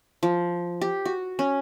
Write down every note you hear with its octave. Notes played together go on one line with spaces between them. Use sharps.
F3
G4
F#4
C#4